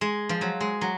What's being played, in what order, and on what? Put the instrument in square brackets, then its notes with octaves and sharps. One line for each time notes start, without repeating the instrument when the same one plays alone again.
[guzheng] G#3
F3
F#3
G#3
F#3